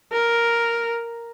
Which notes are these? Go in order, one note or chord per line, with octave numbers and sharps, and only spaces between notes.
A#4